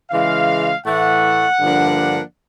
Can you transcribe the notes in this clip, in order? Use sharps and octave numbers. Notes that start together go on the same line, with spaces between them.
C#3 E3 G#3 F5
A2 E3 A3 F#5
G2 D3 F3 A#3 D4